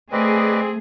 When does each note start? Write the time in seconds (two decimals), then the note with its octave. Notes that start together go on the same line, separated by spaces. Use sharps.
0.12 A3 C4 G#4 B4 D5 D#5